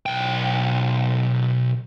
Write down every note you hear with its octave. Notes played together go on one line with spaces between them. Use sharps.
B1 G5